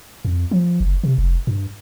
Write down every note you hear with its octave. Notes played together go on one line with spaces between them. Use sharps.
F2
F3
F#1
C3
F1
G2